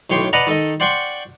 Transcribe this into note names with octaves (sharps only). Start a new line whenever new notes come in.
B1 A2 C#5 G5 C6 D6
B4 D5 D#5 F#5 A5 A#5
D#3 A4 D#5
C5 D5 F#5 G5 C6 C#6